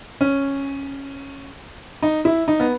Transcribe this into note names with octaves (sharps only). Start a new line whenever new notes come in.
C#4
D#4
E4
D#4
B3